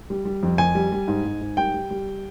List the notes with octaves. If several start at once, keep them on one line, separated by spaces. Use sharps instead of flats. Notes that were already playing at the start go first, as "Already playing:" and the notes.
G3
G3
F2
F2 G#5
G3
G3
G#2
G#2
G#2
G3 G5
G3
G3